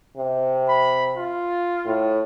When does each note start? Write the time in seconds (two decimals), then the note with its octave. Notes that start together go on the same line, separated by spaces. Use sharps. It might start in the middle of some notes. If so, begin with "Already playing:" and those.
0.17 C3
0.69 B5
1.17 F4
1.86 A2